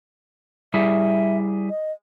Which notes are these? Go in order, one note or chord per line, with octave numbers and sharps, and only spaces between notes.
G3 E4 G#4 E5
D#5